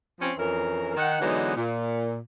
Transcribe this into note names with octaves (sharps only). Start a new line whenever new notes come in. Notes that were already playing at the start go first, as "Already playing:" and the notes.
F3 C4 C#4
F2 E3 C#4 A#4
D#3 F#5
D3 E3 F#3 G#3 B3 D#4
A#2